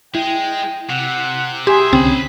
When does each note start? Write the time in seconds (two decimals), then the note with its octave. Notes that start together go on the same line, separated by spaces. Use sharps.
0.15 G#3 E4 G5
0.90 C3 F#5
1.67 B1 G4 G#4 E5 G#5 C6
1.93 C2 D3 C4 C#4 C5 B5